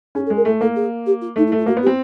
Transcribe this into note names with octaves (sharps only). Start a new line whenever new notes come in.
C#4 G#4
A4
G#3
A#4
A3 A4
A#3 A4
G#4
G4
F4
A3 D#4
E4
A3
F4
A#3 F#4
B3
G4
C4